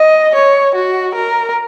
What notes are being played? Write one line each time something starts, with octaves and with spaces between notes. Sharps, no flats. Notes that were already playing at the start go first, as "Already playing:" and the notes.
Already playing: D#5
C#5
F#4
A#4